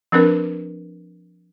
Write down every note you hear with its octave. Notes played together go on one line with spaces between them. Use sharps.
F3 C4 D4 A#4 B4